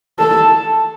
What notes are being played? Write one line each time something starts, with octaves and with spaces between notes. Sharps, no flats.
A4